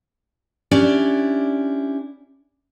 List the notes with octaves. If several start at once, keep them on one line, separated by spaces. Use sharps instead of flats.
C#4 D4 E4 G4 D5